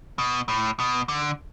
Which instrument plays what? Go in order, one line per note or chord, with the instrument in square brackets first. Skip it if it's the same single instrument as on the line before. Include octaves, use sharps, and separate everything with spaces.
[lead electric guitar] B2
A2
B2
D3